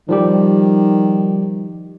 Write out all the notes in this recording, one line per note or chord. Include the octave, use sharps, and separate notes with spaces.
D#3 F3 G3 G4